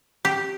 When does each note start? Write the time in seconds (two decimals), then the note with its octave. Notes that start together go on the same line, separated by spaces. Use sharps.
0.25 G4